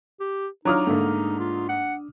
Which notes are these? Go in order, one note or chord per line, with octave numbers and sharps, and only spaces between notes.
G4
F#3 D4 D#4 F4 A#5 D6 D#6 F6
G#2 D3 A3 A#3
F4
F#5